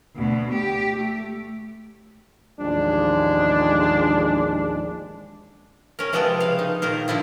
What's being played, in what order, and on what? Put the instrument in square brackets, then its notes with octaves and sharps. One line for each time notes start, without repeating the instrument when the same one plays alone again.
[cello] D2 B2
G4
A3
[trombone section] A1 D#2 F3 G#3 D4
[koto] C#4 A#4
C3 F3 G#3 B3 A4 G5
C#3 F5
D#4
A#2 D#3 A#4 C5
D3 F3 E4 F4